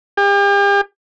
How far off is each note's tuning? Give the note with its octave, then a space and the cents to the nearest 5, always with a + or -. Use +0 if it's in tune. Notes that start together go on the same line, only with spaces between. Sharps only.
G4 +40